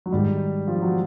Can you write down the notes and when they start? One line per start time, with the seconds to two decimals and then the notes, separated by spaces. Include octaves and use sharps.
0.06 F#3
0.12 G#2 D#3 G3 G#3
0.67 F3
0.82 F#3